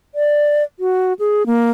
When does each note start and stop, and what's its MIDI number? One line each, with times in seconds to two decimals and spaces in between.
0.15 0.63 74
0.79 1.13 66
1.19 1.46 68
1.46 1.71 58